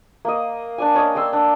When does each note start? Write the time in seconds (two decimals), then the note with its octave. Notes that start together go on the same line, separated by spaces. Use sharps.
0.25 A#3 D#5
0.78 D4 D5 G#5
0.95 C#4 D#5
1.15 D5 G5 C6 E6
1.33 D4